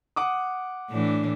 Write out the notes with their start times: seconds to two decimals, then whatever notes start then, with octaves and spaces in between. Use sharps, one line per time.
0.16 F#5 D6 D#6
0.91 A2 E3 D4